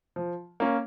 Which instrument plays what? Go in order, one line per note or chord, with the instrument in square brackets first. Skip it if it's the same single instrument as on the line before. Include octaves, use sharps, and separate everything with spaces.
[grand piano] F3
A#3 C#4